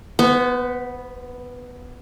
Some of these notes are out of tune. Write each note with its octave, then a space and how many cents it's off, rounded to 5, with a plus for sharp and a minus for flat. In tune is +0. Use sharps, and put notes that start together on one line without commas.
B3 +0 C5 -40